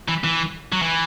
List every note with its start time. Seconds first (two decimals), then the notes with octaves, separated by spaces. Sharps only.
0.08 E3
0.24 E3
0.73 F#3
0.82 E3